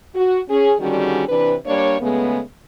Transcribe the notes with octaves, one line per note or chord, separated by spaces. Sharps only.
F#4
C#4 G#4
D3 D#3 G3 C#4 F#4 G#4
C3 E3 D4 B4
G3 A#3 D4 C#5
C#3 G#3 A3 B3